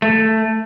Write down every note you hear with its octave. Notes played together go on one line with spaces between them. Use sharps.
A3